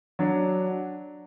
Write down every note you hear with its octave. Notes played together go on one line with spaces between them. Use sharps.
F#3 D4